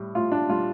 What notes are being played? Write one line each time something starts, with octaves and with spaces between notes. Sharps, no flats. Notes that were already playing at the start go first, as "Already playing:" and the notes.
Already playing: A2 G3
A2 F4
D4
G3 F4